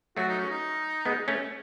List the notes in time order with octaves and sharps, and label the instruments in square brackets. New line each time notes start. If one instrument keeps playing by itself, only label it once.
[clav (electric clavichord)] F#3 A3 [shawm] F#4
[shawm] D#4
C#4
D#4
[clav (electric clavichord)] G#3 B3
A3 C#4